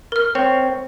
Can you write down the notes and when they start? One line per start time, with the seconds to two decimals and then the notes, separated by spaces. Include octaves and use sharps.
0.12 A#4 F6
0.35 C4 C#5